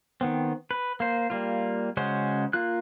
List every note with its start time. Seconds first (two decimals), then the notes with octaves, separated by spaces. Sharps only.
0.21 D#3 B3 C4
0.71 B4
1.00 A#3 C5
1.30 G3 A#3 F4
1.97 C#3 G#3 C#4 F#4 C5
2.53 A#3 F4 F#6